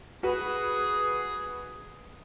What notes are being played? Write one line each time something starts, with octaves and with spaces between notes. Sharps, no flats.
F#4 G#4 B4